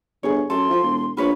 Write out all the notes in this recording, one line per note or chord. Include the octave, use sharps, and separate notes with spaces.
G1 G#4 C#5
F#2 A4 C6
F3
E1
A#1 F4 B4 C#5 B5